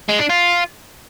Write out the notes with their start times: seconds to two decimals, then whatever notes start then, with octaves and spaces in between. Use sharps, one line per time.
0.09 G#3
0.19 D4
0.30 F4